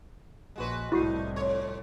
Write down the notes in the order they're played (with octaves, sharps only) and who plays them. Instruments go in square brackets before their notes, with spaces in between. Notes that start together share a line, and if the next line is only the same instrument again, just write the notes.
[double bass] A#1 [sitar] G#3 F#4 B4
[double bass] C2 A2 [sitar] A3 D#4 [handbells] E4 F#4 C7
[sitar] F2 C#5